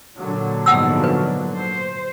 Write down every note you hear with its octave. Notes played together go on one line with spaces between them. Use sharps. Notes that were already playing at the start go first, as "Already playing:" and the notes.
A#2 D3 F#3
G#2 B2 F3 F#5 D#6 E6
B4
C5